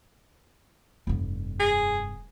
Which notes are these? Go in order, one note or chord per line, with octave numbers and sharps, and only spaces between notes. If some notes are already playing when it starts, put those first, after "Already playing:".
F1 G2
G#4